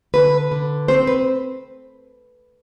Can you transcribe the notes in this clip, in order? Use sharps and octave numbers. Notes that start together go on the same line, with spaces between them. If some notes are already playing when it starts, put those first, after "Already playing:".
D3 B4
D3
C4 C5
B4